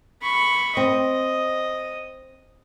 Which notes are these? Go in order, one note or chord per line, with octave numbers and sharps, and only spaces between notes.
B5 C#6
C4 D#5